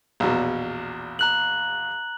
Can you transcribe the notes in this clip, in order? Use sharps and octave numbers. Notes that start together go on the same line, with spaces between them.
A#1 E2 B2
A#5 F#6 F#7